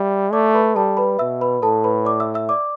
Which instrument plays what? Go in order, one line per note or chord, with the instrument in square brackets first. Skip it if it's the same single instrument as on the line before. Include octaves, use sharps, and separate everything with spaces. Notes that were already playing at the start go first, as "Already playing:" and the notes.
Already playing: [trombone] G3 [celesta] E5
[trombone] A3 [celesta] D5 D6
[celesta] B4 B5
[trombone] G3 [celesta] A4 A5
[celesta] B4 B5
[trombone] B2 [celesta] E5 E6
[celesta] B4 B5
[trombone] A2 [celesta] A4 A5
[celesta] B4 B5
D5 D6
E5 E6
E5 E6
D5 D6